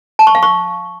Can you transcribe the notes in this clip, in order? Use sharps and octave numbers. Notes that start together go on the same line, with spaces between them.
A5
C#6
F5
C#6